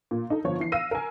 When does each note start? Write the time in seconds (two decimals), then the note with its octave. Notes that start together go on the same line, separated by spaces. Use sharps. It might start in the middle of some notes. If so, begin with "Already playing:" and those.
0.11 A#2
0.30 D#4 A4
0.44 G1 F3 C#5
0.60 E3 C7
0.72 F5 E6 A#6 D#7
0.91 A#4 G#5